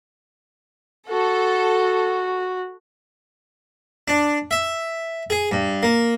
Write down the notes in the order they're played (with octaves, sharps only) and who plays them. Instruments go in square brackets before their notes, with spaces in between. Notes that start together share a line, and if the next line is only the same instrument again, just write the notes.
[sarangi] F#4 [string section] A4
[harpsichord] D4
E5
G#4
G2
A#3